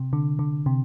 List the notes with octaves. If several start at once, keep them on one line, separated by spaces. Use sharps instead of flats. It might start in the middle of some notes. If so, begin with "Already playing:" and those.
Already playing: C3
D3
D3
C3